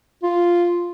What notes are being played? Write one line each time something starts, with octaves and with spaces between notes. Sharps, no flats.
F4